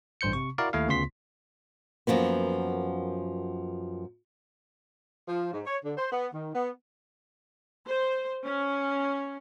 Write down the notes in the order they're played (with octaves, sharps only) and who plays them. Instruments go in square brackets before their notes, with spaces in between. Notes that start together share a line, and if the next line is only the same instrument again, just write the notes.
[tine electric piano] A1 G2 C5 G6 C#7
C3 C#6
E4 F#4 A#4 D5 F5
D#2 A3 E4 F5
D2 C#3 B3 F4 C6 B6
[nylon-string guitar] F#2 F3 A#3 B3
[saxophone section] F3
G#2
C#5
D3
C5
B3
D#3
B3
[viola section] C5
C#4